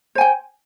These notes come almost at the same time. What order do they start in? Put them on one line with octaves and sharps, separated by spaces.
C5 G#5 G5